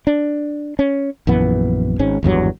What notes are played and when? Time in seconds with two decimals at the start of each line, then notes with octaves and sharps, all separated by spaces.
0.07 D4
0.79 C#4
1.27 A#1 F#2 E3 B3
1.99 G#1 G#2 C#4
2.23 G#1 E2 G2 F#3